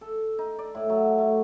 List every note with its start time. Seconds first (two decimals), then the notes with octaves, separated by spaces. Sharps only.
0.01 A4
0.39 D#4
0.59 D5
0.75 A2
0.90 F#3
1.18 A3